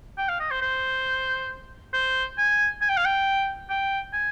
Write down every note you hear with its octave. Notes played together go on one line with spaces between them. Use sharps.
G5
F5
D#5
C5
C5
C5
G#5
G#5
G5
F5
G5
G5
G#5